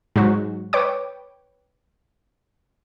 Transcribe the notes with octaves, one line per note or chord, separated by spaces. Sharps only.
G#2 F#3 F#4
B4 C#5 G5 D6